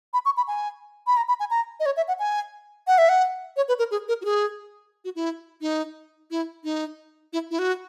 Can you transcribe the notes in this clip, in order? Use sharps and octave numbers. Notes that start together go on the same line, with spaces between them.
B5
C#6
B5
G#5
B5
A#5
B5
G#5
A#5
D#5
C#5
E5
F#5
G#5
F#5
E5
F#5
C#5
B4
A#4
G#4
A#4
F#4
G#4
F#4
E4
D#4
E4
D#4
E4
E4
F#4